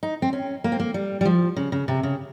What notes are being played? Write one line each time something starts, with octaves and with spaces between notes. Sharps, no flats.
D#4
C4
C#4
A#3
C4
A#3
G3
G3
F3
C#3
C#3
C3
C#3